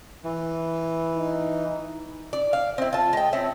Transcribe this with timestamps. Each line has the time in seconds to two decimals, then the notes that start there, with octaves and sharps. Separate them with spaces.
0.24 E3
1.17 D#4
2.33 D5
2.53 F5
2.78 C4 E4
2.93 F4 A5
3.13 G#3 G5
3.33 C4 E4 C#5